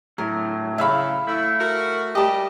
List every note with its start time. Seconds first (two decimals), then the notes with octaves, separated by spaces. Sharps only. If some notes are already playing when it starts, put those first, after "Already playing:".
0.18 A2 F#3 A#4
0.78 C#3 E5 F5 B5
1.27 A3 E4
1.60 F#4 A#4
2.15 G3 G4 D#5 A5